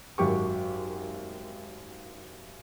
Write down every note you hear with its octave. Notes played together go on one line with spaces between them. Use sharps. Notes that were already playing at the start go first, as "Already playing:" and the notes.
G#1 F#2 F#3 G4 C#6